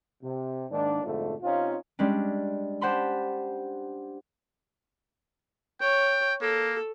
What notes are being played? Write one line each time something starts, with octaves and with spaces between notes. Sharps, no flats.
C3
G#2 D#3 A#3 D4
F2 G#2 B2 D3 F3 A3
C3 C4 C#4 D#4 F4
G3 G#3 C#4 D4
G4 C5 F#5 A5 B5 C6
C#5 G5
A#3 A4